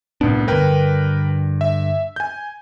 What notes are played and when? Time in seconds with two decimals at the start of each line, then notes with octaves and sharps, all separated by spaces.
0.21 C2 A2 B3 D4
0.48 G2 D3 A#4 B4 G5
1.61 E5
2.16 G#5 G6